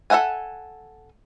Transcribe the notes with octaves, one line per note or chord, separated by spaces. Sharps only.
A4 C5 E5 F#5 G#5